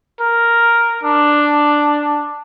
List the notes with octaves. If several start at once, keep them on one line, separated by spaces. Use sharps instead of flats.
A#4
D4